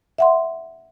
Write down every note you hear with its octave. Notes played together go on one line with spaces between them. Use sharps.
E5 F#5 C6